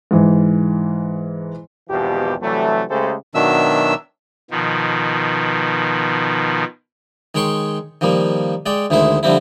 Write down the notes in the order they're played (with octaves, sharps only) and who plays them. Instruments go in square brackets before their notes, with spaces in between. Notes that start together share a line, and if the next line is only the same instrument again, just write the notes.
[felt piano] G#2 E3
[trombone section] G#1 E2 B2 F3 G4
C3 E3 F#3 G3 A3
C#3 G#3 A3 G4 A4 C5
[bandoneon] B2 D#3 F#3 D4 E5 E6
[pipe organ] B2 D#3 F3
[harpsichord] D#3 G#3 C#5 G5 C6 C#6
D#3 F3 G3 A#3
G#3 D5 G5
D2 D#3 G#3 E4 C5
D3 F3 G3 C4 E4